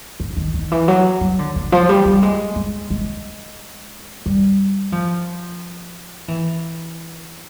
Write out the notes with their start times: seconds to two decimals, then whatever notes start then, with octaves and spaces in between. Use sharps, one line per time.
0.20 D3
0.37 D#3
0.54 D#3
0.72 E3
0.88 F#3
1.21 F#3
1.39 D3
1.56 D3
1.72 F3
1.89 G3
2.05 G3
2.23 G#3
2.56 G#3
2.90 G#3
4.26 G3
4.92 F3
6.28 E3